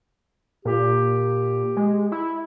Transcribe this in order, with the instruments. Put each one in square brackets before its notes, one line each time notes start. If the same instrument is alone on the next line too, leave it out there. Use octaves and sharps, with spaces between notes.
[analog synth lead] A#2 [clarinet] G4
[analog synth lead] G#3
E4